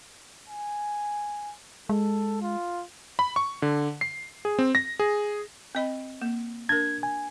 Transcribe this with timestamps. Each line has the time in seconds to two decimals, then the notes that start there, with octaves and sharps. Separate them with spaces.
0.48 G#5
1.89 G#3 A4
2.42 F4
3.19 B5
3.36 C#6
3.62 D3
4.01 C7
4.45 G#4
4.59 C4
4.75 A#6
4.99 G#4
5.75 C4 D#5 B5
6.22 A#3
6.69 D4 A#4 G#6
7.03 G#5